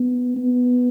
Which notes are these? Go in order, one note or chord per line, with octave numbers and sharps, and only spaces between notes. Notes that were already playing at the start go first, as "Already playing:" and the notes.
Already playing: B3
B3